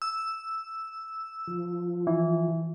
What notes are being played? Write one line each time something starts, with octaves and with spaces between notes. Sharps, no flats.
E6
F3
E3